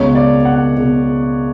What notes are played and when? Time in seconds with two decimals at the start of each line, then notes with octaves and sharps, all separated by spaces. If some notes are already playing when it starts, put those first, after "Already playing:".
Already playing: C#2 B2 C#5
0.15 D5
0.45 F#5
0.76 C#2 B2